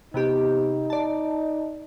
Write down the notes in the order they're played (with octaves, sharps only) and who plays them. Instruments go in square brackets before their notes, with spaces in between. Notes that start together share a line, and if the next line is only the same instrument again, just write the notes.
[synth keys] C3 B3 G4 [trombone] D#4
[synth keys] D5 A5